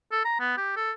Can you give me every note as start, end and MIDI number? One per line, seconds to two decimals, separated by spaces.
0.12 0.23 69
0.25 0.39 82
0.40 0.56 59
0.57 0.73 67
0.76 0.91 69